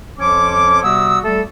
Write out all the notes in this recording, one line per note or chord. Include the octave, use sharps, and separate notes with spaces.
F2 F3 C#4 C#5 D6
C3 G3 B3 F#4 D#6 E6
G3 A3 A4